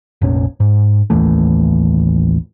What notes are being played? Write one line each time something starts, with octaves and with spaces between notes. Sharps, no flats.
F1 A#1 C#4
G#2
A1 D#2 E3 A3